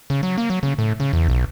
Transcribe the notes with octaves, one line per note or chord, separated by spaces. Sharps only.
C#3
F#3
A#3
F#3
C#3
A2
C#3
E2
B1